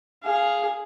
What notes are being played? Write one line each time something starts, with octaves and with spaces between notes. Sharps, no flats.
G#4 F5